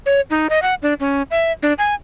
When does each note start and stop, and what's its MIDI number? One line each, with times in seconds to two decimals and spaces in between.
0.06 0.21 73
0.30 0.47 63
0.50 0.62 75
0.62 0.74 78
0.82 0.94 62
1.00 1.22 61
1.31 1.52 76
1.63 1.73 62
1.78 1.94 80